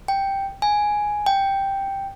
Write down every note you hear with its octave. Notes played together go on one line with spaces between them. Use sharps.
G5
G#5
G5